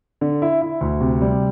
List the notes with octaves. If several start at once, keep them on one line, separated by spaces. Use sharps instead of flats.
D3
E4
E4
D2
C3
G3